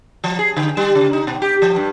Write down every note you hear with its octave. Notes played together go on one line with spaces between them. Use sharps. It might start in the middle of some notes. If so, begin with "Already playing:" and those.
F3
G#4
D3
G3
C#3
D#4
B2
G4
F3
G2